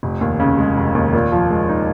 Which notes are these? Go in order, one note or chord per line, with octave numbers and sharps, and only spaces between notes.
F1
D#2
C#3
G#3
F1
D#2
A#2
F3
G#3
D#4